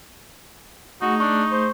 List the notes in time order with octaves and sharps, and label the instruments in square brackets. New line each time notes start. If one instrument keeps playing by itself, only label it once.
[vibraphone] A3 G#4 [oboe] D#4 [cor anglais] F#4
[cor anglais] D4 [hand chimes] C#6
[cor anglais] C5